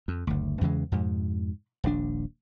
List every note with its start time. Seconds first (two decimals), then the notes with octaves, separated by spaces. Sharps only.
0.08 F2
0.27 F#1 D2
0.61 E2 C#3 E3 G#3
0.92 F2 G#2 B2
1.84 D#1 A#1 D4